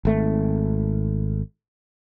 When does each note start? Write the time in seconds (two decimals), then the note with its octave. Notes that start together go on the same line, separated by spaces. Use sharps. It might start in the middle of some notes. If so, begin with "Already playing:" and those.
0.05 G#1 A3